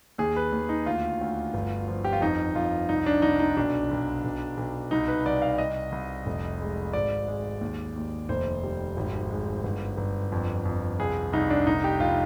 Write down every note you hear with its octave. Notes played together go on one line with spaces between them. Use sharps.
D#2 G#4
B4
D#2
D#4
D2 F4
D2
G1
F3
G4
F4
F2 D#4
F2 F4
C2 D#4
D4
C2 D#4
D#4
B1 D4
B1
B1
B1
C2 D#4
B4
C2 D5
F5
C2 D#5
C2
F1
G#3
G#1 D5
G#3
D#2
D#2
F1 C5
G3
G#1
G#3
G1
G1
F2
F2
C2 G#4
C2 D#4
D4
F1 D#4
G4
F1 F4